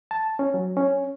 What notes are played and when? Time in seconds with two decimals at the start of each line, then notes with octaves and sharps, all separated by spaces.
0.11 A5
0.39 C#4
0.54 F#3
0.77 C#4